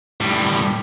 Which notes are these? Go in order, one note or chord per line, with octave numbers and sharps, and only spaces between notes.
A2 G3